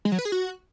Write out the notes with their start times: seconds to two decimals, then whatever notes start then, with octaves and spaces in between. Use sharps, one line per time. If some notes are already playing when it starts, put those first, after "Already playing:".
0.05 G#3
0.12 F#3
0.19 B4
0.25 G#4
0.32 F#4